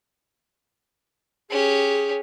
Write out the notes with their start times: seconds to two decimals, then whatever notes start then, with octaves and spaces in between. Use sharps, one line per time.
1.50 C#4 G4 G#4